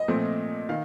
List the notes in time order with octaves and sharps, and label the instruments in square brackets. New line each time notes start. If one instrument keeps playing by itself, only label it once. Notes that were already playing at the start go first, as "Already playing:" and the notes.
Already playing: [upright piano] D#5
A#2 F3 A3 C4
D#3 F5